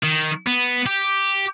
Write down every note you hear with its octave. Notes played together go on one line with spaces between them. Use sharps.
D#3
B3
G4